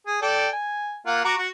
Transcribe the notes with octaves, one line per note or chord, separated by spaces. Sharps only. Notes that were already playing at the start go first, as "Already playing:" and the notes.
G#4
A4 D5 G5
G#5
A#3 F4 F#5
F#4 A#5 D6
F#4